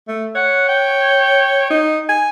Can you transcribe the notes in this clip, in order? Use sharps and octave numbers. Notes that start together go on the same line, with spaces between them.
A3
C#5 F#5
G5
D#4
G#5